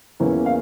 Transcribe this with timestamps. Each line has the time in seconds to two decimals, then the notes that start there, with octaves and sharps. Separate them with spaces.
0.20 E2 E3 A#3 C#4 E4
0.46 F5